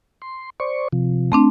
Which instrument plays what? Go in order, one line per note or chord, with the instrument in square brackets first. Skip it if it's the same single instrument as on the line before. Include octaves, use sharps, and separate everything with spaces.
[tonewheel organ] C6
C5 D5 C#6
C3 F3
[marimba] A3 C4 D4